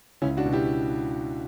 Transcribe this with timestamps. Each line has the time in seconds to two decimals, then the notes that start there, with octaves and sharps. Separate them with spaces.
0.22 C#2 C#4 E4
0.37 D4 F#4
0.45 B2
0.53 E4 G4